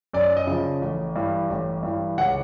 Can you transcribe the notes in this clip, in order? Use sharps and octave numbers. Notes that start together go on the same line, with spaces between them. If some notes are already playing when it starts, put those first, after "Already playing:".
F#2 D5
D#5
C#3 F3
A1
G2 E3
A1
G2 E3
C#2 F#5